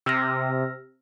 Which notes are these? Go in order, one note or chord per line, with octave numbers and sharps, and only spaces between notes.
C3 E6 F6 A#6